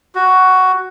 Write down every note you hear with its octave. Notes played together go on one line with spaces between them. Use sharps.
F#4